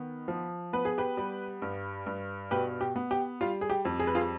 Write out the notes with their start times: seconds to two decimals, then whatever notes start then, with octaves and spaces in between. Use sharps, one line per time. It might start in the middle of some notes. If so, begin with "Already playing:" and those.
Already playing: D#3 B3
0.28 F3
0.73 B3 B4
0.85 G#4
0.98 G4 B4
1.17 G3
1.62 G2
2.06 G2
2.51 B2 G4 B4
2.81 G4
2.96 B3
3.11 G4
3.41 G3 F4
3.61 G#4
3.70 G4
3.85 F2
4.00 G#4
4.07 B4
4.15 F4 G#4